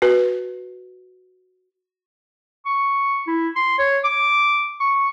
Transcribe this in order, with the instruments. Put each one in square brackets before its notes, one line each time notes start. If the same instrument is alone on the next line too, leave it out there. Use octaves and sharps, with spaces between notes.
[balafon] F#4 B4
[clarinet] C#6
E4
C6
C#5
D6
C#6